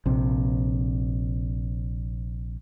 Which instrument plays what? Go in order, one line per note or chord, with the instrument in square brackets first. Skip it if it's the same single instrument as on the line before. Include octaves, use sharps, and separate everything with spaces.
[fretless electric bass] A#1 C3